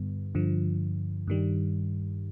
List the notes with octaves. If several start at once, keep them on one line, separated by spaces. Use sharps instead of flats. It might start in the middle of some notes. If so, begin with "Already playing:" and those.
Already playing: G2 D3 G3 B3
G2 D3 F3
G2 D#3 G3